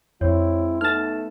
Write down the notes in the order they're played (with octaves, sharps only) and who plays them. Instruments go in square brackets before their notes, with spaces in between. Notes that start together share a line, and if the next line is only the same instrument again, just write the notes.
[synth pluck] F2 [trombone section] G#3 C4 E4 [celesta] C#5
[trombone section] A3 B3 [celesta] D#4 A5 E7 [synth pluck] F6 A6